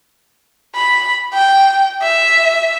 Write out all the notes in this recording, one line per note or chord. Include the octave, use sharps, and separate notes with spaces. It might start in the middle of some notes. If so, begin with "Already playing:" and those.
B5
G5
E5